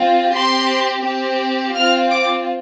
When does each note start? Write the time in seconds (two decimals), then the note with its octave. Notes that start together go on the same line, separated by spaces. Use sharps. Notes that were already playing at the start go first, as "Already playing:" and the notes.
Already playing: C4 F4
0.32 C4 G4 C6
1.03 C4 G4
1.75 C4 F4 F6
2.11 D6